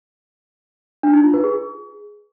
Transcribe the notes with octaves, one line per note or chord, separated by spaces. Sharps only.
D4
D#4
F4
B4
G#4